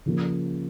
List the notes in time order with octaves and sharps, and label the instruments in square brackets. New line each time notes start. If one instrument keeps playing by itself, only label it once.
[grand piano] C#3 F3 A#3